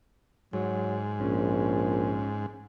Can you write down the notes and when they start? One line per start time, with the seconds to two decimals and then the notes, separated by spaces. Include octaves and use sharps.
0.53 G#2 F#3
1.21 A#1 C#4